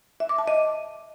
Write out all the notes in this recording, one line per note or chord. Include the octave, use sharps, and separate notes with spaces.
E5
D6
A5
D#5